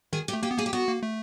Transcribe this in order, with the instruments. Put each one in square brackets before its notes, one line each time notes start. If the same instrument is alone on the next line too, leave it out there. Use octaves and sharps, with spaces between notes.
[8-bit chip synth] D#3 [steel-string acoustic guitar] G#4
[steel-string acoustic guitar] G4
[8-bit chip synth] A3
[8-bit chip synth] A#3 [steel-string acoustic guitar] G4
[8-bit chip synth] B3
[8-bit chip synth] A#3 [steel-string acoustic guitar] G#4
[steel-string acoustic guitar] G4
[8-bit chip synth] B3 [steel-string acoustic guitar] F#4
[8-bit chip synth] A#3
A3